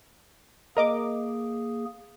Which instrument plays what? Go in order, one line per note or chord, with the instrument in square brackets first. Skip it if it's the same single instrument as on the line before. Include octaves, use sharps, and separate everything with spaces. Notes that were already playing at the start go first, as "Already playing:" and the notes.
[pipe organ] A#3 G#4 [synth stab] A#4 D#5 D6